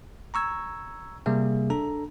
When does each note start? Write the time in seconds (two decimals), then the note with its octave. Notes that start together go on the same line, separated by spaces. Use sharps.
0.34 A#5 C#6 E6 G#6
1.26 C3 G3 A#3 G#4 E5
1.70 D4 A4 A#5